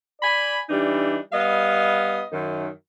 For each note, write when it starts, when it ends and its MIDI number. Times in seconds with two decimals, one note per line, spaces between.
0.21 0.58 74
0.21 0.58 80
0.21 0.58 83
0.69 1.17 52
0.69 1.17 55
0.69 1.17 62
0.69 1.17 63
1.32 2.22 55
1.32 2.22 59
1.32 2.22 75
1.32 2.22 77
2.32 2.67 42
2.32 2.67 51